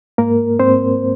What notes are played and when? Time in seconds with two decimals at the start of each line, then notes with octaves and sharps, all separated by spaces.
0.18 G#2 A#3 A#4
0.59 G#2 C4 C5